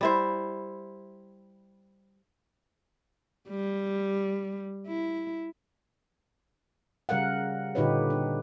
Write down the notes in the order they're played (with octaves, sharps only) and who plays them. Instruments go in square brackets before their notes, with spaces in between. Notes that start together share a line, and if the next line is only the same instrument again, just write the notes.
[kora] G3 E4 C5
[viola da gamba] G3
E4
[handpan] C#3 G3 A#4 F5 F#5
A#2 D3 D#4 G4 B4 C#5
D4